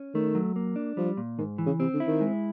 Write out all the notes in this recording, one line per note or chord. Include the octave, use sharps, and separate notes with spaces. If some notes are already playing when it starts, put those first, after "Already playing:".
Already playing: C#4
D#3 A3
F#3
A#3
D4
F3 G3
A#2
G#2 D#3
E3
C#3
C3 C4
D3
E4
D#3
G#3